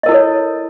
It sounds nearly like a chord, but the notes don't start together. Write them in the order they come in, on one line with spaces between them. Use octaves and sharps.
D#5 A#4 E4 A4 C#5